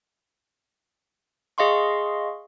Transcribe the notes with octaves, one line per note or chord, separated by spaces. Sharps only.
G#4 D#5 F5 C6 C#6